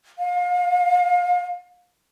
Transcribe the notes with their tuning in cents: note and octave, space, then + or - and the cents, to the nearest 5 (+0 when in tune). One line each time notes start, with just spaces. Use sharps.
F5 +35